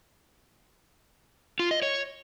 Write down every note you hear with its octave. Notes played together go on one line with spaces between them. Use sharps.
F4
D#5
C#5